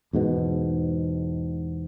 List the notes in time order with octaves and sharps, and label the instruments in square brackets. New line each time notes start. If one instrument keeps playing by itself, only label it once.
[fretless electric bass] E2 G#2 B2